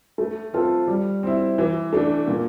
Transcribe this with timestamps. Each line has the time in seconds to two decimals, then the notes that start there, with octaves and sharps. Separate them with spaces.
0.18 A3
0.53 C4 F4 A4
0.88 G3
1.23 C4 E4
1.58 E3
1.93 A3 D4
2.28 A#2